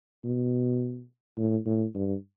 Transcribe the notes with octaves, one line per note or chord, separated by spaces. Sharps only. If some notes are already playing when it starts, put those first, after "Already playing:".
B2
A2
A2
G2